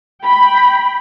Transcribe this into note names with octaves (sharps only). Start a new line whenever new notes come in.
G5 B5